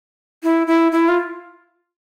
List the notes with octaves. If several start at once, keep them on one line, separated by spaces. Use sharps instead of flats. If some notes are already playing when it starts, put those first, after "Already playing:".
E4
E4
E4
F4